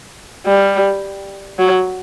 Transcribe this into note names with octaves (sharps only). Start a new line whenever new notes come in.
G3
F#3